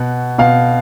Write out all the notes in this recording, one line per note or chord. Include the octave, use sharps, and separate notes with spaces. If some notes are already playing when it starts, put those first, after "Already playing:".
Already playing: B2 F#5
B2 F5